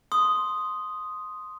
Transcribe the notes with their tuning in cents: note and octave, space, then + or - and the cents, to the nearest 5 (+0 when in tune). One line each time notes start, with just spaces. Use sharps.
C6 +0 D#6 +0